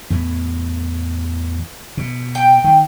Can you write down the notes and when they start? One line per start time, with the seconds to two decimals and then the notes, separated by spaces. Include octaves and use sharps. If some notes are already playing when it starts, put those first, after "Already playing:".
0.10 E2 A2 E3
1.97 B2
2.35 G5
2.64 D#3